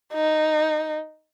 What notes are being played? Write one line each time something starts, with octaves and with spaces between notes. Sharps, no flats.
D#4